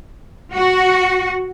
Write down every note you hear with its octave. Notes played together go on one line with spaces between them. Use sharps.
F#4